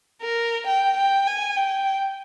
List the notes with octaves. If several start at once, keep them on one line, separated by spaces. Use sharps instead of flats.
A#4
G5
G5
G#5
G5